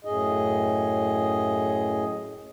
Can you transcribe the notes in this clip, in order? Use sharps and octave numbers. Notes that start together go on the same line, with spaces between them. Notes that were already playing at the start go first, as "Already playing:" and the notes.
F#2 A2 G#4 D#5